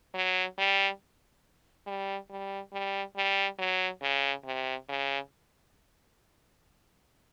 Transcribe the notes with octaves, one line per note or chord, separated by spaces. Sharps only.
F#3
G3
G3
G3
G3
G3
F#3
C#3
C3
C#3